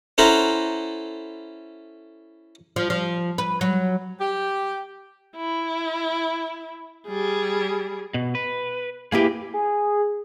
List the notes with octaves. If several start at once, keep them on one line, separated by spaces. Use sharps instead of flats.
C#4 E4 A4 C5 F#5 A#5
F3
F3
B4
F#3
G4
E4
G3 G#4
B2
B4
A#3 E4 G4 G#4 B4
G#4